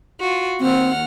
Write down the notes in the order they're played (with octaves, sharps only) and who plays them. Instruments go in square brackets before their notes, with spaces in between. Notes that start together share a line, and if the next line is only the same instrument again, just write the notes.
[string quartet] F4 F#4
[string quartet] D#2 F#5 F6 [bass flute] C4